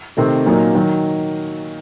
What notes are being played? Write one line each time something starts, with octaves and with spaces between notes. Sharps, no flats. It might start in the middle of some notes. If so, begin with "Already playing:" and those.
C3 D#3 A3 C4
A#2 F#3 A#3 D#4
D#3 F#3